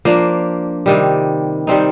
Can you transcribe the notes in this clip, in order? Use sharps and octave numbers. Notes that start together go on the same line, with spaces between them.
F3 A#3 D4
C3 D#3 G3
D#3 G3 C4 D#4